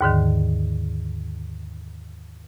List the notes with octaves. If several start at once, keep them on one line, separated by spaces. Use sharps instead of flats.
D#2 G#2 D3 D#3